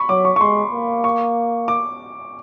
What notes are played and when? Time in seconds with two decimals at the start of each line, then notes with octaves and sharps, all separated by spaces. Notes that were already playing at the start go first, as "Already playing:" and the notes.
Already playing: B5 C#6
0.09 F#3 D6
0.25 C#6
0.36 C#6
0.40 G#3 C6
0.72 A#3
1.04 C#6
1.68 D6